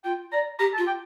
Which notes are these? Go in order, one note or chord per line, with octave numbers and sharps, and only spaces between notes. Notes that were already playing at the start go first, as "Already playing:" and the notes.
F4 G5
D5 A#5
G4 A#5
A5
F4
G5